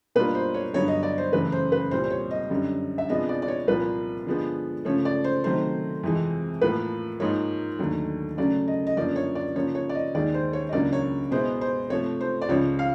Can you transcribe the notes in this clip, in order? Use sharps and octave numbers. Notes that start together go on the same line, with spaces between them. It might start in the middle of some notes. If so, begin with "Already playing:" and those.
B2 G3 A#3 D4 F4 B4
C5
C#5
G2 D3 F#3 B3 C#5
D#5
D5
C5
F#2 C#3 E3 A3 B4
C5
B4
C2 A#2 G3 C4 C5
C5
C#5
D#5
F#2 D3 G3
E5
C3 F3 G#3 B3 D4 D#5
D5
D5
C#5
C2 A#2 F3 A#3 B4
D3 F3 G#3 B3
C#3 F3 A3 C#5
D5
C5
C3 D#3 F#3 A3 C5
F2 C3 E3 G#3
A2 F3 A#3 B4
G#2 F3 A#3 C#5
D#2 D3 F#3 A3
C#3 F#3 A3 C#4 D5
D#5
D#5
F#2 D3 F3 A#3 D5
C#5
D5
C#3 F3 A#3 C#5
C#5
D5
D#5
D#2 D#3 G#3 D5
C5
C#5
D#5
C#2 C#3 F#3 A#3 D4 D5
C#5
B2 G#3 B3 E4 C5
C5
C3 F3 A3 C#5
C5
D5
C#2 C#3 F3 C#5
F5